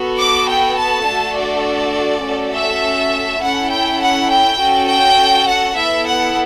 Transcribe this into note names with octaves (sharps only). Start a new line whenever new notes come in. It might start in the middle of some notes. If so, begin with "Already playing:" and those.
Already playing: B3 F#4 A4
D6
G5
A5
A3 D4 F#4 A4
D5
A3 C#4 F#4 A4
E5
C#4 E4 A4 F#5
G5
F#5
G5
C#4 F#4 A4
G5
F#5
B3 E4 A4 E5
F#5